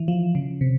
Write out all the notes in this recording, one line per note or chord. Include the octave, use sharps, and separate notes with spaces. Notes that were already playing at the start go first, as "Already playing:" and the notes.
Already playing: E3
F3
C#3
C3